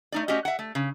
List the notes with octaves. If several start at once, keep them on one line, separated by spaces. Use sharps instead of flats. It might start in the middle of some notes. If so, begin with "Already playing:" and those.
A3 D#4 D5
A3 C#4 F#4 G4 D#5
E5 F#5
A3
C#3